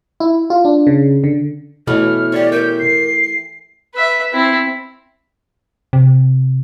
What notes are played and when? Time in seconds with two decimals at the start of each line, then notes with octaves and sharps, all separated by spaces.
0.20 E4
0.50 F4
0.65 D4
0.87 C#3
1.24 D3
1.87 B2 E3 A3 C#5 F6
2.32 G4 C#5 D5
2.52 A#4 E5 G6
2.79 C7
3.95 B4 E5
4.33 C4 E4
5.93 C3